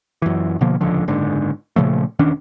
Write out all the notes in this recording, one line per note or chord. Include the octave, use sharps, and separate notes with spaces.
F#2 E3
B2 D3 F3 A#3
D#1 C#2 D3 F3
F#1 G#2 D3
A#2 C#3 F3 A3
E1 D#3 C#4 D4